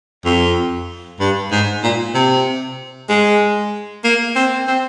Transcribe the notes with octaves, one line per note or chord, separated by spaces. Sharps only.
F2
G2
G#2
A#2
C3
G#3
A#3
C4
C4